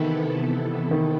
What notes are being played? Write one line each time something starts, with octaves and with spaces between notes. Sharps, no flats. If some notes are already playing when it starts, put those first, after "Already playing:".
Already playing: C3 D#3 E3 B3 E4 A4
D#3